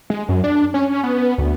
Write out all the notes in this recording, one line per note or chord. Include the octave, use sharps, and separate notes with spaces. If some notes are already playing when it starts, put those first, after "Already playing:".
G#3
F#2
D4
C#4
B3
D2